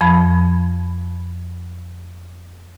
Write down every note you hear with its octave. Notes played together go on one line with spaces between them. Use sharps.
F2 F3 B5